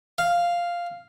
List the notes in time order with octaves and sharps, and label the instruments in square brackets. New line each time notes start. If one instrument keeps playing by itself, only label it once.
[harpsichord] F5